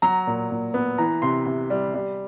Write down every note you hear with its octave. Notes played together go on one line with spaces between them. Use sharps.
F#3 A#5
A#2
A#2
B3
E3 A#5
C3 C6
C3
G3
G3